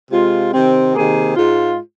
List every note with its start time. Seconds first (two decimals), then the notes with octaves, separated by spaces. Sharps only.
0.10 C3 G#3 F4
0.53 C3 D#3 C4
0.95 C3 D#3 A#3 G#4
1.36 G#2 G#3 F4